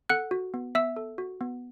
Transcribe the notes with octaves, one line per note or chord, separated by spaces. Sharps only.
A4 F#5 F#6
F#4
B3
B3 E5 E6
A4
F#4
B3